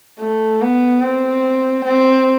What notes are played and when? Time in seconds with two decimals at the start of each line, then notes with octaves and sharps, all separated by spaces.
0.20 A3
0.62 B3
1.02 C4
1.85 C4